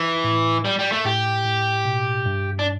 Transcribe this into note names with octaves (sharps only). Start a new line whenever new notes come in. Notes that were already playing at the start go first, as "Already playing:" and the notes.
Already playing: E3
A2
G3
G3
A3
A2 G4
A2
B2
G2
D4